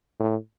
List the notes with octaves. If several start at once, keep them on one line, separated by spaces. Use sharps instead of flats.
A2